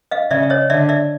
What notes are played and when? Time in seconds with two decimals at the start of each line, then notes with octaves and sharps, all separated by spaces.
0.11 D#5 F5
0.31 C#3 D5 E5
0.43 E5
0.50 C#5 D#5
0.70 D3 D5 E5
0.89 D5 E5